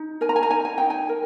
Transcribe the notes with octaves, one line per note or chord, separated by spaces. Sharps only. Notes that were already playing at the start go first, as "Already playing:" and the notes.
Already playing: D#4
A#4 G#5
A#5
G#5
A#5
D#4 G#5
G#5
D#4 G5
G#5
A#4